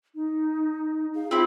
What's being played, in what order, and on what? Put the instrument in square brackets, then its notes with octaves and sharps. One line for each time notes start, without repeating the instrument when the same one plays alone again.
[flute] D#4
[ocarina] G#4 [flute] F5
[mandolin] C4 E4 [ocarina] F4 [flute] E5